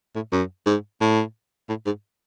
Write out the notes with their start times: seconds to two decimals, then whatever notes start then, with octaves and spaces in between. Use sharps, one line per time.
0.15 A2
0.32 F#2
0.66 G#2
1.01 A2
1.69 A2
1.86 G#2